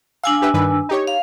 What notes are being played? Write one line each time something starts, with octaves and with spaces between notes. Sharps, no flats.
D4 F5 G#5 E6
G4 B4 E5
G2 D#3 B4
D#4 G4 C#5
F5